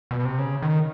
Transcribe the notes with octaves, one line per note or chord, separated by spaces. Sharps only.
B2
C3
C#3
D#3